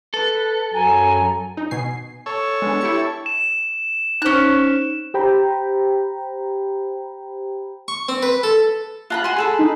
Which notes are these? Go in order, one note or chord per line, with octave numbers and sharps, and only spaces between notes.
A4 B4
F#2 F#3 G#5 A#5
D#4
B2 G#5 C7
A4 C#5
G#3 B3 D4
E4 G4 C#7
E7
C#4 D#4 C5 F#6
G4 C5 G5 A#5 B5
C#6
C4
B4
A4
F4 A#5 B5 F#6
F#4 G#5 C6
G#4 A4 B5
D#4